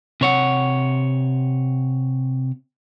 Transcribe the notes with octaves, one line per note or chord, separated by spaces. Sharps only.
C3 C#5 F#5